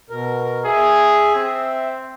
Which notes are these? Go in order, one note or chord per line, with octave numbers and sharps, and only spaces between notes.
B2 A#4
G#4 E5
C4